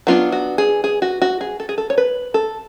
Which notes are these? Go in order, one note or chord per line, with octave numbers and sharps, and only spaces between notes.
F#3 B3 D4 F4
F#4
G#4
G#4
F#4
F#4
G#4
A4
G#4
A4
C#5
B4
A4